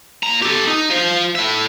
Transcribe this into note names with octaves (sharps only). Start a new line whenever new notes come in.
A#2 A#5
G4 A4
D#4
F3 C5
A2 E5